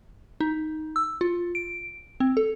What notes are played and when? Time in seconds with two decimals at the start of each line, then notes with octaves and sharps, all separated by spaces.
0.40 D#4
0.96 E6
1.21 F4
1.55 D7
2.20 C4
2.37 A4